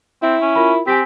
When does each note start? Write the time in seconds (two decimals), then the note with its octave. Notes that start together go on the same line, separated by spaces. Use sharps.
0.23 C4 E4
0.42 C#4
0.55 F4 A#4 B5
0.87 C4 G4 G#5 B6